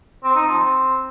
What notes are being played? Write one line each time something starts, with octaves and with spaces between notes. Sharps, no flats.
C4
D#4
F3
C4